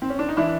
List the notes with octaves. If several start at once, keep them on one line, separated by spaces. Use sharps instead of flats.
C4
C#4
D4
D#4
E3 D4 E4